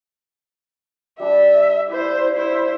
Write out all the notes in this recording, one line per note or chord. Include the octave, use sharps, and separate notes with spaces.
G3 D4 E5 D6
E4 C5 D5
E4 C5